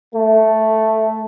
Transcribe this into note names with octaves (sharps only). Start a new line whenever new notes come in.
A3